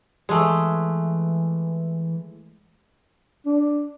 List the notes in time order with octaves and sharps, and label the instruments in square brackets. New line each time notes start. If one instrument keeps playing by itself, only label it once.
[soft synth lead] E3 [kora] G#3 A3
[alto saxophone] D4